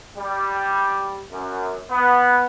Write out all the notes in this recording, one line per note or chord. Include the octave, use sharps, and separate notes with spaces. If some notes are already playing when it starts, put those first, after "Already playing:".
G3
F#2
B3